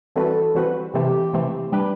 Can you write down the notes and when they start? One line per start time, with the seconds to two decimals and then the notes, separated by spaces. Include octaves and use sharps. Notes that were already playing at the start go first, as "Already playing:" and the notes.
0.16 E3 G3 C4 F#4 A4 B4
0.55 E3 G3 C4 F#4 B4
0.94 C3 E3 A3 C4 G4
1.33 C3 E3 A3 C4
1.72 G3 D4 G4 B4